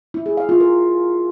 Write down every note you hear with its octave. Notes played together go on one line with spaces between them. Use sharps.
E4
G#4
F5
F4
A#4